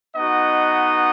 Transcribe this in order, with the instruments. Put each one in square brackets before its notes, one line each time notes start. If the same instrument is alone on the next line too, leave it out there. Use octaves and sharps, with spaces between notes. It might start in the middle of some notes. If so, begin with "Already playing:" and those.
[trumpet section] B3 D#4 F#4 D#5 F#5